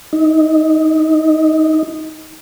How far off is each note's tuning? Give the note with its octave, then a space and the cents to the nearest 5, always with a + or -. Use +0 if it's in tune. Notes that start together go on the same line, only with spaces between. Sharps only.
D#4 +15